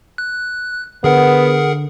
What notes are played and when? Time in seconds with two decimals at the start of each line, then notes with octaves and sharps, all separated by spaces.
0.18 F#6
1.04 D3 B3 G#4 A#4 F#5